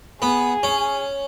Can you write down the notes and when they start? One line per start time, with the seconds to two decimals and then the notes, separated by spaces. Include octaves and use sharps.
0.22 B3 G#4
0.63 C#4